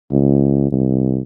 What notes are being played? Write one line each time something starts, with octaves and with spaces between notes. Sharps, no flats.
C#2
C2